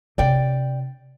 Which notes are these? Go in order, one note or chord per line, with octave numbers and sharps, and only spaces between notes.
C3 D4 D5 G5